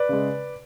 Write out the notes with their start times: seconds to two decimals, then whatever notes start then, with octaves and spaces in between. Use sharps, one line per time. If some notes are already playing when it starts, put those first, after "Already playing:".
Already playing: B4 D5
0.09 C#3 G#3